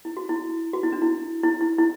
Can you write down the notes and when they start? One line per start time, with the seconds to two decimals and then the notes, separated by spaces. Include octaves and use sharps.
0.05 E4
0.17 F#4
0.29 E4
0.73 F#4
0.83 E4
0.92 D4
1.02 E4
1.43 E4
1.61 E4
1.78 E4